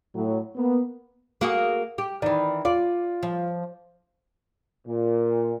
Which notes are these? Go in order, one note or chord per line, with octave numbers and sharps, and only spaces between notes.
A2 F#3
A#3 B3
A#3 F#4 G#4
G4
D#3 E3 D5
F4 D5
F3
A#2